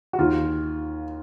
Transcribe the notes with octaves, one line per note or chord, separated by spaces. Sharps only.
F#4
D#2 F4